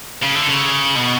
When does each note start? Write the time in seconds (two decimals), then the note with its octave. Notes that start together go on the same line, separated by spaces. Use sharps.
0.23 C#3
0.35 D3
0.47 C#3
0.96 B2